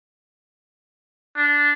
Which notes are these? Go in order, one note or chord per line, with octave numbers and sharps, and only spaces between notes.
D4